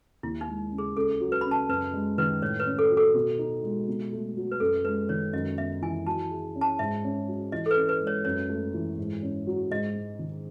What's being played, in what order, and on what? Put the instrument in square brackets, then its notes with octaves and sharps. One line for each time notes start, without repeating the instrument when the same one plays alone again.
[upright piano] D#2 [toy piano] E4
[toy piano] D#4
[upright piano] G#3
C#3
[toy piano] G#4
[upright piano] C#2 [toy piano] A4
[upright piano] F#3
[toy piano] B4
[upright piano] C#3 [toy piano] B5
[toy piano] A5
[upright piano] F#2 [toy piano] B4
[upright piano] G#3
[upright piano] D#3 [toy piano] B4
[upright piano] A2 [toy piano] C#5
[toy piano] B4
[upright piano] C#4
[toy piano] A4
[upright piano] F#3
[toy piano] A4
[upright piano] B2
D#4
G#3
B2
A3
F#3
[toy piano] B4
[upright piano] F#2 [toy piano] A4
[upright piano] G#3 [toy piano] B4
[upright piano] D#3 [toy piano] C#5
[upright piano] F#2 [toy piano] D#5
[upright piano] B3 [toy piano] E5
[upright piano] E3 [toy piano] G#5
[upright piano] F#3 [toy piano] A5
[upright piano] G#4
C#4
[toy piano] A5
[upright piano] G#2 [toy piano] E5
[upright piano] C#4
F#3
[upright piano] E3 [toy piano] D#5
[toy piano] A4
B4
[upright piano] C#4
[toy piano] B4
[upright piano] G#3
[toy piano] C#5
[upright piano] F#2 [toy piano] C#5
[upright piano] A3
E3
G#2
C#4
F#3
[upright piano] G#2 [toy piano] D#5
[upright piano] G#3
D#3